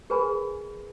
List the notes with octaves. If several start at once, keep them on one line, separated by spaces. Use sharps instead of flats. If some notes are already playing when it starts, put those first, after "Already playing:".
G#4 A#4 B4 G#5 B5